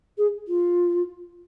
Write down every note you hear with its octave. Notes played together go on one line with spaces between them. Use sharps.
G#4
F4